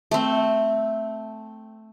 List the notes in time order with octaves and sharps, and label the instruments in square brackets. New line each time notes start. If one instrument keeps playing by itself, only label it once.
[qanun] A3 C4